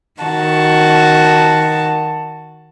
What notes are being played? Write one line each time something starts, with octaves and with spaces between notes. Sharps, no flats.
D#3 F#4 A5